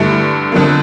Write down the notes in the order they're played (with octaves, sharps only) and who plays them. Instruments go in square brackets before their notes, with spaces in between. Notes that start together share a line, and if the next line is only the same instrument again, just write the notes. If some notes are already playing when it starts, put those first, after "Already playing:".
Already playing: [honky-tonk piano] G2 D3 A3 E4
F2 D3 F3 A#3